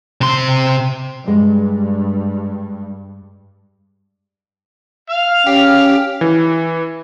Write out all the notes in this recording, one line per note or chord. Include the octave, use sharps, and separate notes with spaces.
C3 C6
G2 G#3
F5 F6
C#4 G4
E3